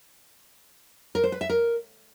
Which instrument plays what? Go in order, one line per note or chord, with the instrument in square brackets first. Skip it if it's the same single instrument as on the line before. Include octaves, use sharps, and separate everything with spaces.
[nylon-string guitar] A#4
C5
B4
E5
A#4